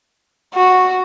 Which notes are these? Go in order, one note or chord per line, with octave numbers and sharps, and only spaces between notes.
F#4